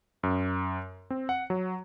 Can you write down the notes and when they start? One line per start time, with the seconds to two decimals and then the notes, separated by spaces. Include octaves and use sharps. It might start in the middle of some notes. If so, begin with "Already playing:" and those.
0.23 F#2
1.10 C4
1.29 F#5
1.50 F#3